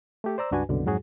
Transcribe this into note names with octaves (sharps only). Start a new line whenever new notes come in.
A3 G4 A4
C5 D5 A#5 E6
C#2 G2 D4 F#4 B4 G#5
C2 F#2 B2 D3
F2 G#2 F#3 F#4 G#4